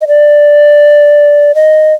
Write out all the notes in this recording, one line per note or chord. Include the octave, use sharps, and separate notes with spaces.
D#5
D5
D#5